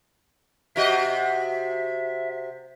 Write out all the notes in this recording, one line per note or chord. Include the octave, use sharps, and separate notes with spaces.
C3 F#4 D#5 E5